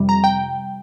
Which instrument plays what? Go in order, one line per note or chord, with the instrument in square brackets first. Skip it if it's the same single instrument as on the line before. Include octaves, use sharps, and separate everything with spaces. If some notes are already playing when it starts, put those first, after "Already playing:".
Already playing: [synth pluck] F2 C3 G3
A#5
G5